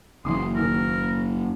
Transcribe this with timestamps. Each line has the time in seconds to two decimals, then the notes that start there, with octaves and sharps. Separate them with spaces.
0.25 F#1 E3 C6 D6 D#6
0.56 D#2 A#3 A#4 E6